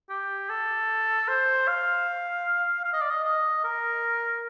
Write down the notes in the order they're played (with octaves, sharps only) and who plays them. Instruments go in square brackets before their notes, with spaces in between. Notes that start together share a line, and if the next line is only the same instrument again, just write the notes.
[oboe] G4
A4
C5
F5
F5
D#5
D5
D#5
D#5
A#4